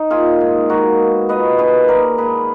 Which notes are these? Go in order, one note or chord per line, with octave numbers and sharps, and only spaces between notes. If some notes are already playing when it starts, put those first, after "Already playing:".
Already playing: D#4
A#3 F4 G#4
G#2
G#3 F#4 A#4
B3
A#2 B4 D#5
D#3 G#4 B4
A#3 A#4 D5
G#2 G#4 B4